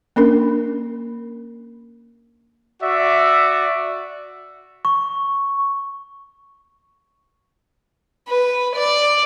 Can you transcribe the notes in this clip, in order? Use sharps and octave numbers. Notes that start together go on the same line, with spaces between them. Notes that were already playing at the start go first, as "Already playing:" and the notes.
A#3 C#4 D4 A#4
F#4 D5 E5
C#6
B4
D5